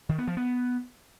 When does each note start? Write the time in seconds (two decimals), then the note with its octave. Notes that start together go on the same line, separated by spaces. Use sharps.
0.09 D#3
0.18 B3
0.28 F3
0.37 B3